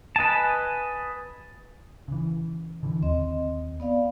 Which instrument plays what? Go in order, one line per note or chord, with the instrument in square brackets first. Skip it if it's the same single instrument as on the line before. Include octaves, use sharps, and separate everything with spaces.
[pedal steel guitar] B4 D#5 G#5 A5
[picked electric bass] C#3 E3
D3 E3
[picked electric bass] D#2 [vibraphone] C4 D#5
[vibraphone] B3 D5 F5